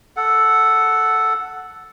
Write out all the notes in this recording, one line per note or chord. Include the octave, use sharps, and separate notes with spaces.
A4 F#5